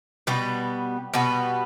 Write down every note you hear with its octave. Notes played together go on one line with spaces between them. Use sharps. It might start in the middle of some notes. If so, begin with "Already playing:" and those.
B2 G3 B3
B2 G3 B3